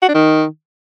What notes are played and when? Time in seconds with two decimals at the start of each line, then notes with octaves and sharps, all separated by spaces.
0.02 F#4
0.08 D4
0.15 D#3